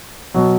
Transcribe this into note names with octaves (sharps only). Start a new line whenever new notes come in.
B2 F#3